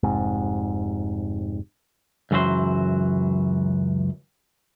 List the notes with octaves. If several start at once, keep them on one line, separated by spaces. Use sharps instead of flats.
F1 G#2 C3
C#2 F#2 E3 F#3 C5